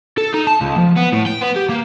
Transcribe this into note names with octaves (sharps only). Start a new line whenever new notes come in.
A4
D#4
A5
C#2
F3
B3
A2
G5
B3
G4
A#3